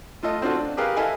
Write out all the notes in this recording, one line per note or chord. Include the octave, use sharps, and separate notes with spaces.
A3 F4 A4 D#5
C4 D4 F4 F#4 A4
D4
G4 G#4 A#4 B4 F5
E4 A4 D#5 F5 G#5